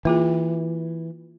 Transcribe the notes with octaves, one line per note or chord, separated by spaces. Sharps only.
E3 A#3 F4 G#4